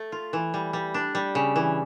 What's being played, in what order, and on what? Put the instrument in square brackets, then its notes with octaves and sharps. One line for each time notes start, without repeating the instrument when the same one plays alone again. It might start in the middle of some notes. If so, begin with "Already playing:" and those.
Already playing: [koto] A3
F4
E3
G3
G3
D4
G3
C#3
E3